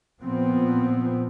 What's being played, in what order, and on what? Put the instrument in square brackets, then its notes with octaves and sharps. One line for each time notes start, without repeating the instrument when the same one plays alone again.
[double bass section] A#2 F3 B3 C4